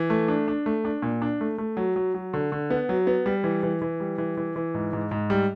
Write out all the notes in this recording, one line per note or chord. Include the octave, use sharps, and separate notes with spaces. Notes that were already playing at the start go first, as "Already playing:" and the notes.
Already playing: E3
A3
D4
D4
A3
D4
A#2
D4
A3
A3
F#3
F#3
F#3
D3
D3
B3
F#3
B3
G3
E3
E3
E3
G3
E3
E3
E3
G#2
G#2
G#2
G3